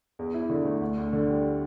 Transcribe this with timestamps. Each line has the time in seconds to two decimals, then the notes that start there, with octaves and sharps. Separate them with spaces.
0.19 E2
0.34 E4
0.50 D3
0.65 A3
0.81 D2
0.98 D2
1.13 D3
1.29 G3